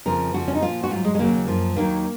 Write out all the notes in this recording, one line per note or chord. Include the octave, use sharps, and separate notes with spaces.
F2 C#3 F3 A#4
F2 C#3 F3 F#4
C#4
D#4
A#2 F3 F4
F#4
G#2 F#3 F4
G#3
G#3
D#2 C#3 F#3 A#3
F#2 F3
D#2 D#3 F#3 A#3